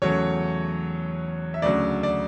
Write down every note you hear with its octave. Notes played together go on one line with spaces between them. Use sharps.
E2 C#3 F#3 A3 C#5
E5
D2 C#3 F#3 D5
D5